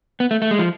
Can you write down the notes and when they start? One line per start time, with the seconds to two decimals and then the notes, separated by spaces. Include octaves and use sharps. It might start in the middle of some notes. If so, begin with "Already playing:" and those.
0.20 B3
0.31 A3
0.42 A3
0.51 G#3
0.59 F3